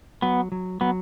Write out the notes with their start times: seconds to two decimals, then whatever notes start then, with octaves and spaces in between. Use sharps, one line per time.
0.22 F#3 B3
0.52 F#3
0.81 F#3 B3